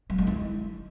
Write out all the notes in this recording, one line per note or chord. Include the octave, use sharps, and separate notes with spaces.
G3
G#3
E4